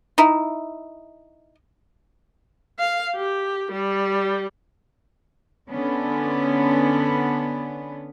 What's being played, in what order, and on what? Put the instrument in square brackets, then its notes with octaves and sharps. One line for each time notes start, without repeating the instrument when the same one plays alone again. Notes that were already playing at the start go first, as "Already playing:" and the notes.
[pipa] D#4 E4
[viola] F5
G4
G3
[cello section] D3 B3 C#4 D4